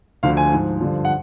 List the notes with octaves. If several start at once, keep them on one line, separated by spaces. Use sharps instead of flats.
D2 D3 F3 F5
G#5
G#2 F3
G2 D3 F3
F#5